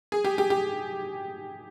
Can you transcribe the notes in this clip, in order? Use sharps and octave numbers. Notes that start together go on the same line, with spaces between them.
G#4
G4
G4
G4